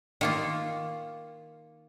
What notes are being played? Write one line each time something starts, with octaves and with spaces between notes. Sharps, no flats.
D#3 A#3 F4